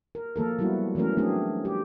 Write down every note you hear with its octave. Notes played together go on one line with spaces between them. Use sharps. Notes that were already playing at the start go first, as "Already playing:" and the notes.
A#4
F3 A#3 A4 A#4
F#3 G3 B3 E4 F#4
E3 F#3 A3 C#4 A#4
F#3 A3 C4 D4 G#4
G4